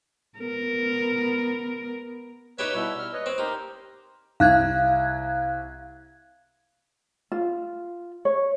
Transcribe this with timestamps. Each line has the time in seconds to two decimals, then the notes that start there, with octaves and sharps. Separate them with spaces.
0.39 B3 A#4
2.59 D#4 G4 B4 C#5 E5
2.75 B2 G3 E4
2.99 F6
3.13 B4 C#5 D#5
3.26 C4
3.38 D#4 G4 A#4 C5
4.40 C2 F5 F#6 G#6
7.32 F4
8.25 C#5